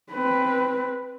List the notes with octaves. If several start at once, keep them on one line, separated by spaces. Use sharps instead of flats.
C4 B4